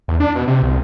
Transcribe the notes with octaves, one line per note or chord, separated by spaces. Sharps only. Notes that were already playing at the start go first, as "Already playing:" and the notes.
E2
D4
B2
C3
C2